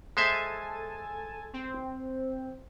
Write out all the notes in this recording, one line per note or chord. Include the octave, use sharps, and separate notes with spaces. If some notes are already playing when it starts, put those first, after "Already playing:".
G#3 A4 C5 E5 G#5 A5
C4